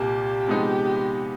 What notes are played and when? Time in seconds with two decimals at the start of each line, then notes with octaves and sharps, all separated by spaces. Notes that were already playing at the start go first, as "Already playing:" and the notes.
Already playing: C2 A#2 G3 A#3 G4
0.47 C3 F3 G#3 B3 D#4